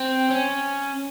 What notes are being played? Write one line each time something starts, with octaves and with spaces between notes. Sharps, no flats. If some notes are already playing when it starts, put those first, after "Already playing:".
Already playing: C4
C#4